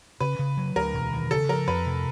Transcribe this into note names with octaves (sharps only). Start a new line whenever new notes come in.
C#3 B4
C#3
F#3
D2 A#4
E1
D#3
C#3 A4
F3 A#4
F2 B4
C3